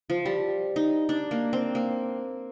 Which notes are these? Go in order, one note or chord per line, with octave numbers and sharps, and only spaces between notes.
F3
G3
D#4
D4
A#3
C4
A#3